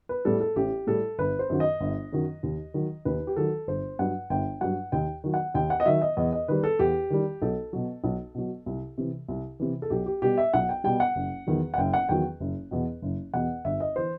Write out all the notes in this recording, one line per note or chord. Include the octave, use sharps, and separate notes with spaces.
B4
A2 G3 A4
A4
A1 G4
A2 G3 A4
G1 B4
C5
F#2 D#3 F#3
D#5
G1
F#2 D#3 F#3
D#2
D#3 F#3
D#2 B4
G4
D#3 F#3 A4
G1 C5
G2 F#3 F#5
G1 G5
G2 F#3 F#5
D#2 G5
D#3 F#3
F#5
D#2 G5
F#5
D#5
D#3 F#3 E5
D#5
E2 D#5
D#5
D#3 G3 B4
A4
E2 G4
D#3 G3
B1 A4
B2 F#3
B1
B2 F#3
C2
C3 E3
C2
C3 E3
A4
B1 G4
G4
B2 G3 G4
E5
B1 F#5
G5
B2 G3 G5
F#5
F#1
E2 D#3 F#3
F#5
F#1 G5
F#5
E2 D#3 F#3 G5
F#1
E2 B2
F#1
E2 B2 F#5
G1 E5
D#5
E3 C5